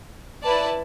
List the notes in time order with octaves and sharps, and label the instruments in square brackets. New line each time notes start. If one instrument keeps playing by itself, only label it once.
[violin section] E4 B4 D5 A5